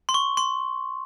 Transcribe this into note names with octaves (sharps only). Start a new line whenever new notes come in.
C6
C#6
C6